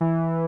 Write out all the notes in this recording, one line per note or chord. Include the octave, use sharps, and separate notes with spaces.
E3